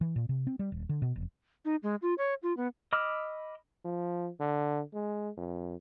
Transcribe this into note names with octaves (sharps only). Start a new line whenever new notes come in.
E3
A#2
C3
C4
G3
D#1
D3
B2
F1
D#4
G#3
F4
C#5
F4
B3
D#5 B5 D6 E6 F6
F3
D3
G#3
F2